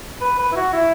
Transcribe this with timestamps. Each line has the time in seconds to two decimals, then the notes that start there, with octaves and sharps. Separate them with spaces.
0.21 B4
0.40 B4
0.52 E4
0.56 F#4
0.73 E4